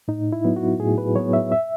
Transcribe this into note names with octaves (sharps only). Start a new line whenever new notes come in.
A2 D#4
E4
F#3 B3
F#4
A2 G#4
B4
F#3 B3 C#5
E5
E5